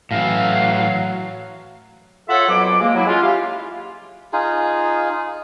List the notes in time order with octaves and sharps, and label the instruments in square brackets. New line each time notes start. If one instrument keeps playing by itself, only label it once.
[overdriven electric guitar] A2 E3 [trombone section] F#3 [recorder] F5
[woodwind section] F4 F#4 A4 C#5 E5 F#5
F2 B2 F#3 D6
G#3 A#3
F#3 E4
G#3 C#4 F4
E4 G4 F5
[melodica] D#4 F4 G#4